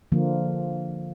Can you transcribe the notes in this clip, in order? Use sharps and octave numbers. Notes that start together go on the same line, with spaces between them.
D3 F3 A#3